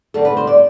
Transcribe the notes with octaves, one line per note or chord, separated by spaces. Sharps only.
D3 G3 C4 A4
B4
C5
D5